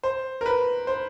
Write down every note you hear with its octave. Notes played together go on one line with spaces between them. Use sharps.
C5
A#4
B4
C5